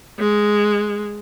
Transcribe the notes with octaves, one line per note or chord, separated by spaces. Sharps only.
G#3